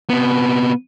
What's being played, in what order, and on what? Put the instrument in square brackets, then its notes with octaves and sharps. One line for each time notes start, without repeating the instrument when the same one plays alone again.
[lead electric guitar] C3 B3